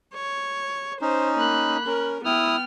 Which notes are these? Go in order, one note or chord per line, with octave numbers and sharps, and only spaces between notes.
C#5
C#4 D#4 C5
A#3 B5 F#6
C#4 A#4
B3 E4 G5 D#6 F6